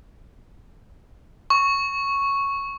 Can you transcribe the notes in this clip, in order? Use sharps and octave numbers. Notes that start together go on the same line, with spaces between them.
C#6